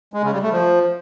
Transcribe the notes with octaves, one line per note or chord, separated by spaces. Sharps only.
G#3
C#3
G3
A3
F3